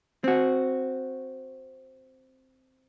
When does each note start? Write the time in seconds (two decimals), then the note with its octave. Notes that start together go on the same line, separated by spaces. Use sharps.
0.24 C4 F#4